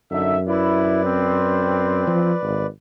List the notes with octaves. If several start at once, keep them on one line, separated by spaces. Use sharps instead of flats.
F#2 D3 D#4 E5
E4 B4 D5
C4
F3
G#1